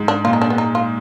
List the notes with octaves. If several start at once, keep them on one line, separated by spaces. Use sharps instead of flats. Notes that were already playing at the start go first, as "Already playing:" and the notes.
Already playing: G#2
D4
A#2 F4
D#4
D4
B3
D#4
F4